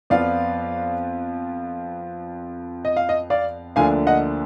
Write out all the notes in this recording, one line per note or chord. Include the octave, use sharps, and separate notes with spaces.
F2 F3 B3 F4 D5 F5
D#5
F5
D#5
D5 F5
D2 D3 F3 A#3 D4 F5 G#5
D#5 F#5